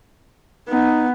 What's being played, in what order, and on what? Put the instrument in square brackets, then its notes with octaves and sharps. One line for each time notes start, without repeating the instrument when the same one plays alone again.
[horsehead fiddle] B3 [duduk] D#4